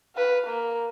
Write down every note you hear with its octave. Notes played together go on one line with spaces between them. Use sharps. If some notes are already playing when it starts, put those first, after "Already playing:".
B4 F5
A#3